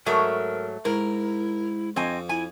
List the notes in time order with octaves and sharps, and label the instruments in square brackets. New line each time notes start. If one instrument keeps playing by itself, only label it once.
[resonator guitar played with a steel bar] G#2 F#3 A3 [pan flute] A#4
[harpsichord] G#2 [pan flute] E4 [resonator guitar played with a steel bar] A#4
[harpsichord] F2 [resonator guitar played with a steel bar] C4 G#5 [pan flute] D#5
[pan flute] E4 [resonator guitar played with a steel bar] G#5